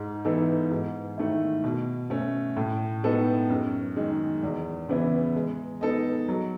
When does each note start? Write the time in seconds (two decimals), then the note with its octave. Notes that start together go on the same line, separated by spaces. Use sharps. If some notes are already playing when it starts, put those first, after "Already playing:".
Already playing: G#2
0.25 E3 B3 D#4 A4
0.71 G#2
1.17 D#3 A3 E4
1.64 B2
2.10 A3 C#4
2.57 A2
3.03 G#3 B3 D#4 A4
3.49 F#2
3.96 D#3 G#3 D#4
4.43 E2
4.89 C#3 E3 B3 E4
5.36 G#3
5.81 B3 D#4 A4 D#5
6.28 F#3